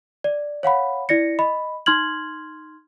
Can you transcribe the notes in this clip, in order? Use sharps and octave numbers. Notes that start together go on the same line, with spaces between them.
D5
C#5 F5 F#5 B5
E4 D5 A#6 C#7
D#5 B5
D#4 C6 F6 G#6 F#7